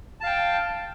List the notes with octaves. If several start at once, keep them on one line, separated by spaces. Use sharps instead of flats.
F5 G5 A5